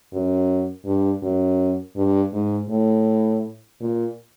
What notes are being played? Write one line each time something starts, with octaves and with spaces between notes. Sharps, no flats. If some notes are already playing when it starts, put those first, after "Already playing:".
F#2
G2
F#2
G2
G#2
A2
A#2